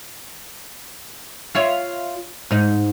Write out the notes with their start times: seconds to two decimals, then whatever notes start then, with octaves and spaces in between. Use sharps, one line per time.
1.55 F4 C#5 E5
2.51 G#2 D#4